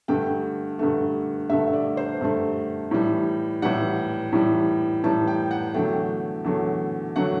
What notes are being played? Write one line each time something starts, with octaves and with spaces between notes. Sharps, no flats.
G2 D3 A3 G5
G2 D3 A3
G2 D3 A3 E5
E5
D5
C5
G2 D3 A3
A2 E3 G3
A2 E3 G3 F#5
A2 E3 G3
A2 E3 G3 A5
G5
F#5
E2 D3 F#3 A3 G5
E2 D3 F#3 A3
D3 F#3 A3 F#5